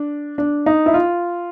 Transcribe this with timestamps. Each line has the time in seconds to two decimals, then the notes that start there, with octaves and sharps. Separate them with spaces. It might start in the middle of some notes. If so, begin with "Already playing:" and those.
Already playing: D4
0.38 D4
0.66 D#4
0.86 E4
0.94 F4